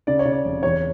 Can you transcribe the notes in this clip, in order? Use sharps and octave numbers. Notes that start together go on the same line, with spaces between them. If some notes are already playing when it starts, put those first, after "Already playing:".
C#3 D5
C#5
C#3
D5
F1
E2 C#5